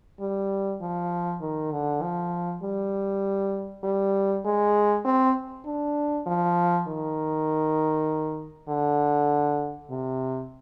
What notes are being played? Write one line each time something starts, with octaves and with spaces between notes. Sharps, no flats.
G3
F3
D#3
D3
F3
G3
G3
G#3
C4
D4
F3
D#3
D3
C3